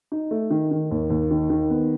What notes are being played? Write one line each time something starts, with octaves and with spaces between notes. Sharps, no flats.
D#4
A3
D#3
D#3
D#2
D#2
D#3
D#3
B3